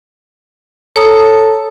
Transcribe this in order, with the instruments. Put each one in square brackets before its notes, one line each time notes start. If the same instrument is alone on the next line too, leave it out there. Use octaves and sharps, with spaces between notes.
[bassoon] A4 [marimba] C#5 A#5 D#6